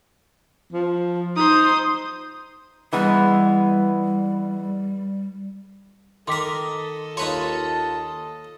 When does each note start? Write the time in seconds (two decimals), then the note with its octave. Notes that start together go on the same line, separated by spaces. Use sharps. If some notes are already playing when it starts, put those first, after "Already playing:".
0.72 F3
1.37 D#4 C5 D#6
2.93 E3 G3 G#3 B3
6.28 D#3 A4 A#4 D#5 C6 D6 B6
7.17 D#2 D#4 F4 B4 C#5 A5 C6